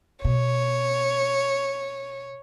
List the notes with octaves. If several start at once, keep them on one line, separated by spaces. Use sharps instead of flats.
B2 C#5